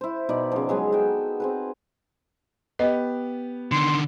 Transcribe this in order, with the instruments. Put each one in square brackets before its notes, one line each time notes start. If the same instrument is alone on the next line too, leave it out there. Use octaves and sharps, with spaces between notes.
[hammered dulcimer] E4 C5
B2 D#4 D5 B5
C#3 F3
F#3 G#3 B3 G#5
F#4 A4 G5
C4 G#4 B4
[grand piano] B3 G4 [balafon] D#5
[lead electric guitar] D3 D#3 [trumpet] C6